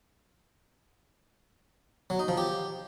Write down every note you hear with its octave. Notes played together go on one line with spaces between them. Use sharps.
F#3
D#4
F3
G4